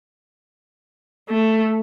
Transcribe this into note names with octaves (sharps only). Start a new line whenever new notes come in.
A3